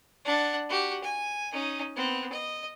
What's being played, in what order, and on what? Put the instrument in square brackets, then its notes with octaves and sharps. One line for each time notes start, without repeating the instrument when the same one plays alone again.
[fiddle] D4 F#5
F#4 G4
G#5
C#4 D#4
B3 C4
D#5